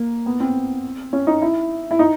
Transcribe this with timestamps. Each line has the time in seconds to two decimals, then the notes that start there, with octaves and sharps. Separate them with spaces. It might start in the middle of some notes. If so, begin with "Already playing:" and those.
Already playing: A#3
0.26 B3
0.40 C4
1.13 C#4
1.27 D#4
1.42 E4
1.91 E4
1.99 D#4